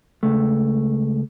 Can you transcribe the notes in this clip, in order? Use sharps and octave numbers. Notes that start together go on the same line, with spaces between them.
C#2 A3